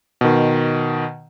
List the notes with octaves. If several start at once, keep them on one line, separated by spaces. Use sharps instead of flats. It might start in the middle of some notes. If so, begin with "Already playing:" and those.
B2 D#3